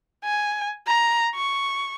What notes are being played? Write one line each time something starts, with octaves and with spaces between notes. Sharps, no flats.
G#5
A#5
C#6